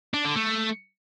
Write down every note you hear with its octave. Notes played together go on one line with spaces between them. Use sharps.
D4
D3
A3